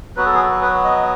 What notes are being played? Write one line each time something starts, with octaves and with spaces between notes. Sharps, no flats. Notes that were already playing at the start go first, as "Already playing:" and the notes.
F#3 B3 F#4 B4
A4
G#4
A4
B4
D#5